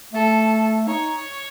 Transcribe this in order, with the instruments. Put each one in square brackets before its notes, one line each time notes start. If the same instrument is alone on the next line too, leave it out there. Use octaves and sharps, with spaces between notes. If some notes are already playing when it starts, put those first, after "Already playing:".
[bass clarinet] A3 [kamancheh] A4
[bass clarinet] D#4 [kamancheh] C#5